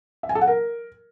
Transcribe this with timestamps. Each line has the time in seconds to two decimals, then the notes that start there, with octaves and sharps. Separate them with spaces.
0.23 E5
0.29 G#5
0.35 A4
0.41 F#5
0.47 A#4